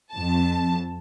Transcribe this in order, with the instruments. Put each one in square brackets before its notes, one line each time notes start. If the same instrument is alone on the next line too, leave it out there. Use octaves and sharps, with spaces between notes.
[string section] F2 A5